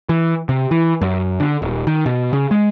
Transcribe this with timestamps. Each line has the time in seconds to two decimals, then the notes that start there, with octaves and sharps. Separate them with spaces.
0.09 E3
0.49 C3
0.71 E3
1.01 F#2
1.40 D3
1.62 D#1
1.87 D#3
2.06 B2
2.33 C#3
2.51 G#3